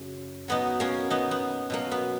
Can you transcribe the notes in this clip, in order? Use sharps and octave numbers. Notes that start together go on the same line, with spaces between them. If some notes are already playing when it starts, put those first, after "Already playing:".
Already playing: F#2 C#3
B2 F#3 B3 D#4
A#3 C#4
B3 D#4
B3
B2 F#3 A#3
B3